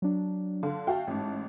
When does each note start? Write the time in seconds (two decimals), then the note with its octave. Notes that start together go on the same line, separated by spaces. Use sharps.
0.02 F#3 D4
0.63 D3 F5
0.87 F#4 E5 F5 G5 A5
1.07 A1 G#2